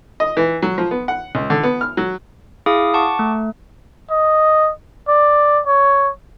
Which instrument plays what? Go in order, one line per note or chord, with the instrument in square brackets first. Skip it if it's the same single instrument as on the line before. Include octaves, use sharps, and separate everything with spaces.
[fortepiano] D#5
E3
F#3
F3
B3
F#5
C#2
D3
B3
F6
F#3
[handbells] E4 G#4 F5 D6 D#6
F#5 A5 C#6 D6
A3
[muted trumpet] D#5
D5
C#5